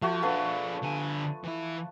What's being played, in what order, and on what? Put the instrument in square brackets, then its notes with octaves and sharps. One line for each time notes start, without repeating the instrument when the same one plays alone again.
[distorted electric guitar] F3 [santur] A3 F#4 C#5
[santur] F3 A4 B4 [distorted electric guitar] D4 G#4
[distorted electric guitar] D3 G#5
E3 E4